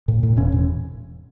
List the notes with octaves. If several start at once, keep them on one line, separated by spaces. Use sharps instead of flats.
A2
A2
E1 C#4
E1